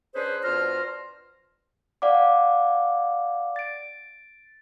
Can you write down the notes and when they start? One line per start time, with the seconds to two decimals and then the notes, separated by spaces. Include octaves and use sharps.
0.15 C#4 D4 G#4 B4 C5
0.43 B2 D4 F4 C5 A#5 F6
2.02 D5 F5 F#5 D6
3.56 A6 D7